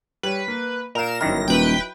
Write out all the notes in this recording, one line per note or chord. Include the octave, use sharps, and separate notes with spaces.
G3 B4 C#5
A#3
A#2 A#4 F5 A#5 E7
G1 F#2 D#3 F#3 D#4 E4 A#4 A#6
D#1 B4 G5